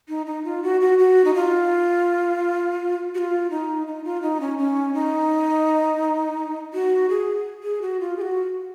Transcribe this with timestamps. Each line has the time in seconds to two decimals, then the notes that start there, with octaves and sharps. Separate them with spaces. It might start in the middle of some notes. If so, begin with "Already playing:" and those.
0.09 D#4
0.26 D#4
0.44 F4
0.63 F#4
0.81 F#4
0.99 F#4
1.25 D#4
1.34 F4
3.15 F#4
3.18 F4
3.51 D#4
3.87 D#4
4.04 F4
4.22 D#4
4.40 C#4
4.58 C#4
4.94 D#4
6.74 F#4
7.09 G#4
7.63 G#4
7.82 F#4
8.00 F4
8.17 G#4
8.21 F#4